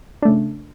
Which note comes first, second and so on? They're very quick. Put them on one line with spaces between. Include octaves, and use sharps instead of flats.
D4 A3 C#3